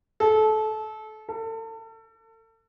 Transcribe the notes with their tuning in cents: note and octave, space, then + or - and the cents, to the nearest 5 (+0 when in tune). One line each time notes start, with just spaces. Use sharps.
A4 -25
A4 +35